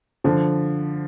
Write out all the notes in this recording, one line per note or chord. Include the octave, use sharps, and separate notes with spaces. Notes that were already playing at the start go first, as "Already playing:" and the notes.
D3 F3